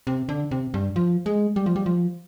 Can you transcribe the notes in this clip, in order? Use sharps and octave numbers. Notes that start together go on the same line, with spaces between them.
C3
D3
C3
G2
F3
G#3
G3
F3
G3
F3